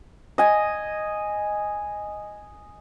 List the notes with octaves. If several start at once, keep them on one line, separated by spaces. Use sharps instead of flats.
D#5 G#5